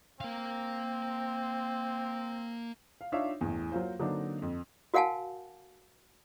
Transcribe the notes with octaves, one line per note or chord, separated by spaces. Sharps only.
A#3 C4 F5
F5
D4 D#4 F4 C#5 E5 F5
A1 E2
F#3 A#3 F4 C5
D3 F#3 A#3 C4 D4 D#4
F2
F#4 A#4 F5 F#5 G#5 A5